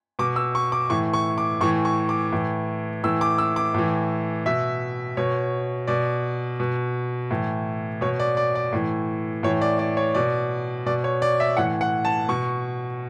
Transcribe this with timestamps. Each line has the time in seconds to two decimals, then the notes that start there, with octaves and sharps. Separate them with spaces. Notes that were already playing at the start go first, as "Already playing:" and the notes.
0.19 B2 D6
0.36 E6
0.55 C#6
0.72 D6
0.90 A2 E3 C#6
1.13 C#6
1.38 D6
1.61 A2 E3 C#6
1.85 C#6
2.09 D6
2.33 A2 E3
3.03 A2 E3 E6
3.21 D6
3.38 E6
3.56 D6
3.74 A2 E3
4.46 B2 E5
5.17 B2 C#5
5.87 B2 D5
6.60 B2
7.31 A2 E3
8.01 B2 C#5
8.20 D5
8.37 D5
8.55 D5
8.73 A2 E3
9.43 A2 E3 C#5
9.61 D5
9.79 D5
9.97 C#5
10.15 B2 D5
10.86 B2 D5
11.04 C#5
11.22 D5
11.40 E5
11.57 A2 E3 F#5
11.81 F#5
12.05 A5
12.28 B2 C#6